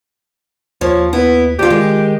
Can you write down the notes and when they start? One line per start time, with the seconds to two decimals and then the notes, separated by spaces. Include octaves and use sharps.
0.81 D#2 F3 C#5
1.13 B3 E4
1.59 D2 F4 G4
1.70 D#3 G#3